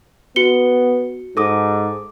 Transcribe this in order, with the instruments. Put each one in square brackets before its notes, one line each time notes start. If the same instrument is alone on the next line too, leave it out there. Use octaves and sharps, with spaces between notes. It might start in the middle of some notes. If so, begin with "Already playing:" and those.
[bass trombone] B3 [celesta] F#4 C#7 G7
[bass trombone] G#2 [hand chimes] A4 D6 D#6